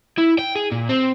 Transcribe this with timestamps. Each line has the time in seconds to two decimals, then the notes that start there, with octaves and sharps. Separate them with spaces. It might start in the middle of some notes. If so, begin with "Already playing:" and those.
0.18 E4
0.39 G5
0.56 G#4
0.72 A#2
0.89 C4